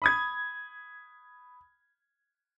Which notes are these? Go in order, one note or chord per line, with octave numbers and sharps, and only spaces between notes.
B5 D#6 G#6